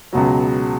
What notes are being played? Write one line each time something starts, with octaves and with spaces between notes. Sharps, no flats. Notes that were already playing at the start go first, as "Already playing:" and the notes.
C#2 B2 F#3